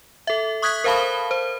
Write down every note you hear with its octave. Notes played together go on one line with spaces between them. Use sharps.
A4 E5
C#6 D#6 F#6 G#6 B6
A#4 C5 F5 A5 B5 G7
C5